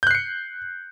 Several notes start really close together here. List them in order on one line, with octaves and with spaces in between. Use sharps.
G6 F#6 C7 C#7